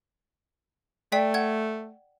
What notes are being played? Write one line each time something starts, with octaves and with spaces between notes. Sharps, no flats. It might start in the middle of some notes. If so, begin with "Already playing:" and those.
A3 D5 G5 B6
F#5 G#6